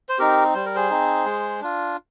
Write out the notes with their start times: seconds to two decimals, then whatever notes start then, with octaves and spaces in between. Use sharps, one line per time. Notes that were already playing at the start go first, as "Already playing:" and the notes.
0.09 C5
0.19 C4 D#4 G4 A#4
0.55 G3 C5
0.65 A#4
0.75 G#4 C5
0.90 C4 D#4
1.26 G#3
1.61 D4 F4